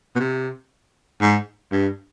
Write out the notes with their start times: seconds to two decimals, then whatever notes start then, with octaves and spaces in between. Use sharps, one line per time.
0.16 B2
0.19 C3
1.21 G#2
1.72 G2